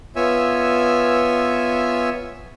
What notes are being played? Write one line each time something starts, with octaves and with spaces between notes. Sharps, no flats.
B3 F4 C#5 E5 G#5 E6